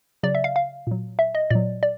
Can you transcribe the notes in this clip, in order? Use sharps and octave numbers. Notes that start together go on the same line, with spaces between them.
C#3 F#3 D5
E5
F5
F5
A#2 F#3
E5
D#5
A#2 F#3 D5
D5